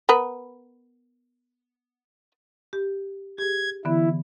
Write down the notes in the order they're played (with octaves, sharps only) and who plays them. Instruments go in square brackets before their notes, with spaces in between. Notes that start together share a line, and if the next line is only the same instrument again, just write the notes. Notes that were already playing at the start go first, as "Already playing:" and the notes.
[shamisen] B3 A#4 B4
[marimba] G4
[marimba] G4 G#4 [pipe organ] G#6
[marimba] D3 E3 B3 [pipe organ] E4